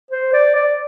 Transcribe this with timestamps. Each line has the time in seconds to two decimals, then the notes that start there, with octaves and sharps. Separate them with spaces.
0.11 C5
0.33 D5
0.56 D5